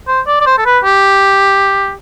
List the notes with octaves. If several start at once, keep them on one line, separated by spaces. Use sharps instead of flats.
C5
D5
D5
C5
A4
B4
G4